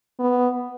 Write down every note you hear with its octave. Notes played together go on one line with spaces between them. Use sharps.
B3